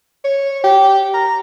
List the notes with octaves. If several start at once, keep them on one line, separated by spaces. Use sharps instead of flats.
C#5
G4
A#5